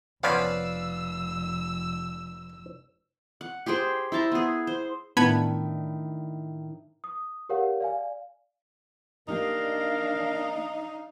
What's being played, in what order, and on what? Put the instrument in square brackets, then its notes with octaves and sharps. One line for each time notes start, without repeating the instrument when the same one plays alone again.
[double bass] F1 [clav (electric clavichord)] F3 B3 C#4 [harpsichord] B4 D5 F5 [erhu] E6
[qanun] F#5
G4 G#4 C5 G5
E4 C5 A5 A#5
B3 G#4
C5
[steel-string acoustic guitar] A2 D#3 [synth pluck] B3 B5 G#6 [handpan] D4 E4 [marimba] A5
[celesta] D#6
G4 G#4 A#4 C#5 F5 F#5
D5 F5 G#5
[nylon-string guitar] A#3 G4 D#5 [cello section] D4 F5 [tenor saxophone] D#4 [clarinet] A#4